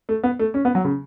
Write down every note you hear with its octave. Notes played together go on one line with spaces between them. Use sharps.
A3
B3
A3
C#4
B3
F#3
C#3